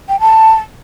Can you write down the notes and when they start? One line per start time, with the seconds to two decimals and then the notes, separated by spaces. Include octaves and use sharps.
0.09 G5
0.20 A5